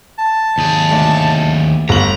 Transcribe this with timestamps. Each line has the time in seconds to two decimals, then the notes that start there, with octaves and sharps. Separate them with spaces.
0.19 A5
0.58 D#2 G#4
0.91 D2
1.89 G1 A#5 F#7